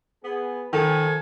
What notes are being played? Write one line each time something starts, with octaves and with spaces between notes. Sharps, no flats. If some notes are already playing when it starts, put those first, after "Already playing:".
B3 G#4
D#3 F3 A4 G#5